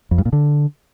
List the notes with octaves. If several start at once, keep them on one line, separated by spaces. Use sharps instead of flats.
F2
G2
A#2
D3